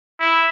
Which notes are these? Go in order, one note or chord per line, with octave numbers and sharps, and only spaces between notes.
E4